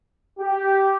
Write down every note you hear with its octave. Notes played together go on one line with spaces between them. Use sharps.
G4